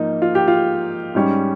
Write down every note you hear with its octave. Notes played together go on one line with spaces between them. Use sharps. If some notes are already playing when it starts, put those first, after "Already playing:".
Already playing: G#2 F3 A#3 D#4
F4
G4
F4
G#2 G3 C#4